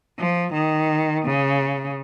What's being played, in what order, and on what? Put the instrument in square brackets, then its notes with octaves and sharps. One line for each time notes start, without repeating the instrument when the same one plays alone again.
[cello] F3
D#3
C#3